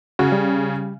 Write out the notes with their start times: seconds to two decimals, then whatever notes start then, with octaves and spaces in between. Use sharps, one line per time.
0.19 C#3 F#4
0.32 G3